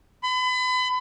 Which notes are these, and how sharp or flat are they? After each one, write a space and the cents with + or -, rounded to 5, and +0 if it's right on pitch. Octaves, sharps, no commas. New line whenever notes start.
B5 +35